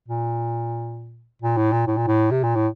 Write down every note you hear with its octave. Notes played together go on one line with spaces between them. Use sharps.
A#2
A#2
A2
A#2
A2
A#2
A2
C3
A#2
A2